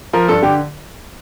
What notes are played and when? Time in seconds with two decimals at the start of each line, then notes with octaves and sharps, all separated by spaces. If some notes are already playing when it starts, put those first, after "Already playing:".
0.13 F3 A#4
0.28 G2 A4
0.42 D3 G4